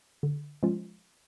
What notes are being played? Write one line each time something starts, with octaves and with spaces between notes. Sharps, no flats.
D3
F3 G#3 C#4 F4